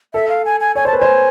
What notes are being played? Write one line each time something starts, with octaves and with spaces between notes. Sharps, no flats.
A4 E5
F5
G#5
G#5
C#5 G#5
C5 A5
B4
C5 G#5